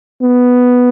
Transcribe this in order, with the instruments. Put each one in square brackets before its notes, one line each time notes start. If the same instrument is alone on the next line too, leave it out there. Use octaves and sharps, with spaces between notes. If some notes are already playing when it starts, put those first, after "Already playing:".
[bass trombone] B3